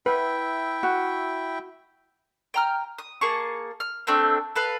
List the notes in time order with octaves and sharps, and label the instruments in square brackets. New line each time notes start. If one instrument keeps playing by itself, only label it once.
[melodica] E4 E5 G5 [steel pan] B4
[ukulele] F#4
[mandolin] G5 A#5 F6
D#6
A#3 G#4 A5 C#6
F6
A3 C4 D4 G5
A4 B4 F5